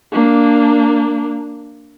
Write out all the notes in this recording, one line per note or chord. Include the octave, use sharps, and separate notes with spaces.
A#3 D4